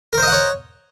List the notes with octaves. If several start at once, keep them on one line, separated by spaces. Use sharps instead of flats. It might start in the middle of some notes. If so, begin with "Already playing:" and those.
A#4 C5 C#5 D#5 F#5